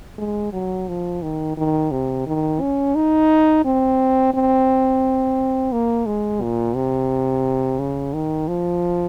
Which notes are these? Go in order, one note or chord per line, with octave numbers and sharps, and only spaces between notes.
G#3
F#3
F3
D#3
D#3
C3
D#3
C#4
D#4
C4
C4
A#3
G#3
A#2
C3
C#3
D#3
F3